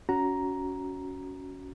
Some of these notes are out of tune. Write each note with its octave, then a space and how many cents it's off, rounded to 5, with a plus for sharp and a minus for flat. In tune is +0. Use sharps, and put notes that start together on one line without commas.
C#4 +15 F#4 +0 A#5 +5